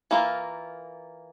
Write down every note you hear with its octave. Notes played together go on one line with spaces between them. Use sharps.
E3 A#3 F4 A#4